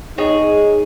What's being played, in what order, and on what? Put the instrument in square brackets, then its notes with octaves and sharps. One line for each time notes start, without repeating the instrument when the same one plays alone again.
[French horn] D#4 [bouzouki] G#4 C#5